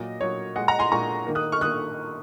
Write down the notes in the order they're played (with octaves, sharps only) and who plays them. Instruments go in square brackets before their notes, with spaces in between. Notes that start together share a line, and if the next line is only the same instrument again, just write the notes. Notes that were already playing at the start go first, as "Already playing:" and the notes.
Already playing: [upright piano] A#2 F#3 A#3 D#5
A#2 F#3 A#3 C#5
A#2 G#3 D#5 F#5
F#5 A#5
G#5 C6
A#2 G#3 A#5 C#6
D#3 A#3
D#6 F#6
C#6 F6
D#3 A#3 D#6 F#6